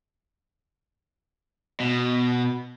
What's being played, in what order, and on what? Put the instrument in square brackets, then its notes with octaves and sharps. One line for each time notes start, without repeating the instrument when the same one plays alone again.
[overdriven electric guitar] B2